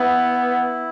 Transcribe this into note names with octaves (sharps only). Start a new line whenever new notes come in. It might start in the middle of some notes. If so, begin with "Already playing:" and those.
Already playing: B3 E4